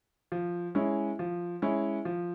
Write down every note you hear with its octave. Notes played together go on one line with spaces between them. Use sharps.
F3
G#3 C#4 E4
F3
G#3 C#4 E4
F3